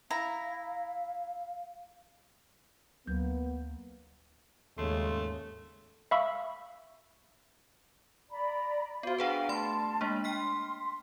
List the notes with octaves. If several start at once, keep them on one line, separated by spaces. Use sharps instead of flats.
E4 F5 A#5
D2 F#3 A#3 B3 G6
D#2 G#2 C#3 A3 C6
E5 F5 B5 C#6 E6
D5 A#5 B5
B3 F4 F#4 C5 F5
D4 G#4 B4 F5 F#5 A#5
A3 A5 B5 C6
G#3 A#3 D4
G5 C6 F6 B6